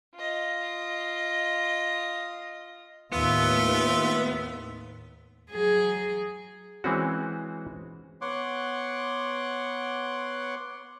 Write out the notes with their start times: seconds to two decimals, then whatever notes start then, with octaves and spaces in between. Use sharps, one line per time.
0.15 F4 D#5
3.12 D#2 A2 B3 F4 E5
5.51 F#3 G#4
6.84 E3 G#3 C4 C#4 F#4
8.21 B3 C#5 F#5 C6 D6